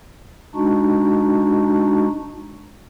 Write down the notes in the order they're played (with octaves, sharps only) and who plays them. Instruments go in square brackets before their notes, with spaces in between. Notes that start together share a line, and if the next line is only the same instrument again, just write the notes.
[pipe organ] G#3 D4 D#4 F#4